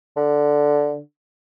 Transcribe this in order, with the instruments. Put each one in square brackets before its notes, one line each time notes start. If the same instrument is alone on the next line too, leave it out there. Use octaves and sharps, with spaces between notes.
[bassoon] D3